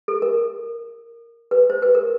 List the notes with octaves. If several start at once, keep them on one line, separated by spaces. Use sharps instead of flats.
A4
A#4
B4
C5
B4
A#4